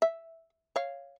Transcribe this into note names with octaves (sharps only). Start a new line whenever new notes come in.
E5
C#5 F5